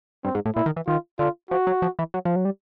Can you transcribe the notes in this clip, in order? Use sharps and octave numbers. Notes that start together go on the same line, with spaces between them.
G2 C4
G#2
A2
A#2 E4
D#3
E3
D#3 F4
D3 F4
F3 F#4
F#3
F3
E3
F#3
F3
F#3
G3